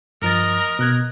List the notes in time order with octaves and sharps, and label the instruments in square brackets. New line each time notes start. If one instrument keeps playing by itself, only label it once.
[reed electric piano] G2 F3 A6 [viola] A#4 D#5
[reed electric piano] B2 F#6 G#6